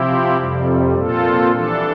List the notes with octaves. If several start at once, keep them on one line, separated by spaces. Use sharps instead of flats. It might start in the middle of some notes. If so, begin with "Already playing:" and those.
Already playing: C3 F3 C4 E4 G4
F2 C3 G3
A#2 F3 C4 F4 A4
E3 G3 D4 A4